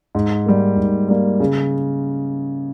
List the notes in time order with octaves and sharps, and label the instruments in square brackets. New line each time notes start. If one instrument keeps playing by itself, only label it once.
[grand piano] G#2
G3 A#3
G#2
G3 A#3
C#3